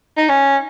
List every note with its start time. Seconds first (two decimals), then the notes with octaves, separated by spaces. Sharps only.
0.17 D#4
0.29 C#4